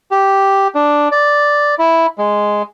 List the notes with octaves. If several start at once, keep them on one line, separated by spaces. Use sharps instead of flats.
G4
D4
D5
E4
G#3